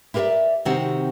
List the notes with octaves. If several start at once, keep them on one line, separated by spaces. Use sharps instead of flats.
E4 G4 A#4 B4 D5 E5
C3 D#3 C4 F#4 G4